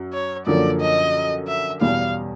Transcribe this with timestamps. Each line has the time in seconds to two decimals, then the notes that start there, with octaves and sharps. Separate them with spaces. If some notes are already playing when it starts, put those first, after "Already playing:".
Already playing: F#2
0.13 C#5
0.46 F#2 D3 F3 A#3 D5
0.80 D#5
1.47 E5
1.81 E2 B2 G3 B3 F5